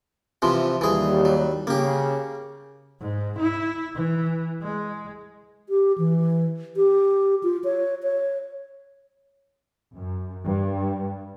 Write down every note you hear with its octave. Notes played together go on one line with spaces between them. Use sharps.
C3 E3 F3
D#2 E3 G3 G#4
F#3
C#3 A#3 G4
G#2
E4
E3
G#3
G4
E3
G4
F4
C#5
C#5
F#2
G2